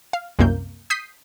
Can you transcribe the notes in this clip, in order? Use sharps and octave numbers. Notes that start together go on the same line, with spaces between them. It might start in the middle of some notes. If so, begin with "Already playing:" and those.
F5
C2 F#2 A#3 G6
D#6 G6 B6 C7 D#7